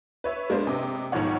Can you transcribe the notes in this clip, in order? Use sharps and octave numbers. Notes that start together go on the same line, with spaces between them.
B4 C#5 E5
G#3 A#3 B3 D4 C5
C3 D#5 D6
B1 G#2 D#3 F3 C#5 F#5